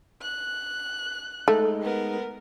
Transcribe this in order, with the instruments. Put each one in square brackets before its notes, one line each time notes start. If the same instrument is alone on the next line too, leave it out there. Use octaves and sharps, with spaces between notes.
[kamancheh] F#6
[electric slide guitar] G#3 D#4 [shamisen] A3
[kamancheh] B3 A#4